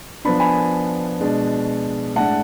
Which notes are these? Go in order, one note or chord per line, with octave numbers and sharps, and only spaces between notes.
F3 B3 D4 B5
G#5 B5
B2 G#3 D4
A2 G#3 D4 F#5 A5